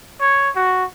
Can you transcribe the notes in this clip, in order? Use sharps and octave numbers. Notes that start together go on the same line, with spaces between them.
C#5
F#4